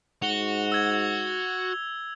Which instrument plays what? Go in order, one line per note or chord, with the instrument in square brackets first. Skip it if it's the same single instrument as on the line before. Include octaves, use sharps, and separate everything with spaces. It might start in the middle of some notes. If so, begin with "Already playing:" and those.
[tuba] G#2 [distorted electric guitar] F#4 [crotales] F7 G7
[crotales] E6 G#6 G7